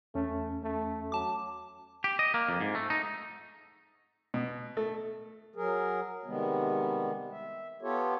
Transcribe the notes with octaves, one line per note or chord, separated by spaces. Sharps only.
E2 A3 C#4
A3
F#3 A5 D6
G4
D#5
A#3
F2
G#2
A3
D#4
B2
A3
F#3 G#4 A#4
C3 D#3 G3 G#3 B3
E5
B3 F4 G4 A4 C#5